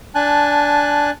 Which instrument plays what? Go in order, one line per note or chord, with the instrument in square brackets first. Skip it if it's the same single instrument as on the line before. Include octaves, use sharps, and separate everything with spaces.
[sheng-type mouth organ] D4 G#5 A5 F#6